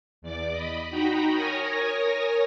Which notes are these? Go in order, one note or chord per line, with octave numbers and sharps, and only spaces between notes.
E2 D5 D6
D#5 B5
D#4 F#4 G5 A#5 B5
A#4 C#5 G#5 D#6 A#6